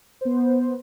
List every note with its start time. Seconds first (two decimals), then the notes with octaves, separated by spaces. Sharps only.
0.21 B3 C5